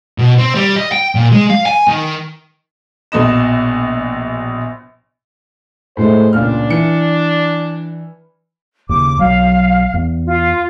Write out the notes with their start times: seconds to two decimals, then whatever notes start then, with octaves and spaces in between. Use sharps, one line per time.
0.18 B2
0.38 C4
0.55 G3
0.76 D#5
0.92 G5
1.15 A#2
1.32 G#3
1.50 F5
1.66 G#5
1.87 D#3
3.12 A#1 B2 D#5 E7
5.97 A2 G#3 A3 C5
6.33 C#2 A#2 D4 F6
6.70 E3 C#7
8.89 D#2 C#3 D6
9.19 B1 F#3 F5
9.94 E2
10.26 F4